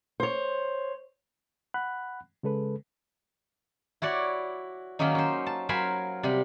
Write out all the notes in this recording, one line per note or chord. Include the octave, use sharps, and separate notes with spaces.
C5 C#5
F#5 B5 F#6
C#3 G#3 A4 B4
E4 F#4 C#5 D5
D#3 F#3 A#3 C#4 D#4
C#4 C5
A5
F#3 A#4 C5 F5 G#5 B5
C3 G3